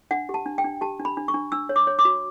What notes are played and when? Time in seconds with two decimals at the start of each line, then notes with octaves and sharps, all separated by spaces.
0.11 D4 F#5
0.29 G4
0.34 A5
0.46 D4
0.58 G5
0.64 D4
0.81 G4 A5
1.00 D4
1.05 B5
1.17 D4
1.28 C#6
1.34 D4
1.52 D4 E6
1.69 C#5
1.76 D6
1.87 C#5
1.99 D6
2.05 F#4